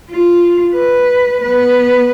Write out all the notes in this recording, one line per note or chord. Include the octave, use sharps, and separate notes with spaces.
F4
B4
B3 B4